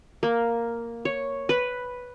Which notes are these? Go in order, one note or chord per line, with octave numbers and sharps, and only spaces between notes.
A#3
C#5
B4